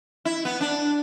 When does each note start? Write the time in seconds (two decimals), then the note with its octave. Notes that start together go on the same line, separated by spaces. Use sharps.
0.25 E4
0.45 B3
0.61 D4